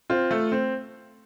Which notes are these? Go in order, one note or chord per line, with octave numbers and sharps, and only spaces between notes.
C4 F4
A3
C4